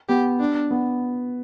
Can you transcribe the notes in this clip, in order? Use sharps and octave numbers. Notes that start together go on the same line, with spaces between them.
B3 G4
D4
B3